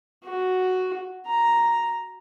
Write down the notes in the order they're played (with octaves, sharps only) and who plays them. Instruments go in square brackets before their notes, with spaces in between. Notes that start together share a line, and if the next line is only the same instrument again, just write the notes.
[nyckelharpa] F#4
A#5